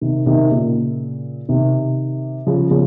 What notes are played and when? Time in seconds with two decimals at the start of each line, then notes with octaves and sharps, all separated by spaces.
0.01 C3 D#3
0.26 C3 D#3
0.51 A#2 C#3
1.49 C3 D#3
2.47 C#3 F3
2.71 C#3 F3